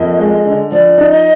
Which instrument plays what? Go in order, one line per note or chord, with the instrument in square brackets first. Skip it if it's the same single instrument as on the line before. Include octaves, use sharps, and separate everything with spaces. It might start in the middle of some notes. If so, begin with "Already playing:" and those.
Already playing: [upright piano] F2 A#3 [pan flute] D#5
[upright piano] G#3
D3
[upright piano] F3 [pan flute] D5
[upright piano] D#4
[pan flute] D#5